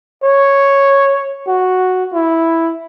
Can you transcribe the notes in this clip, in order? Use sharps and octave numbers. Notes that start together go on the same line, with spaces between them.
C#5
F#4
E4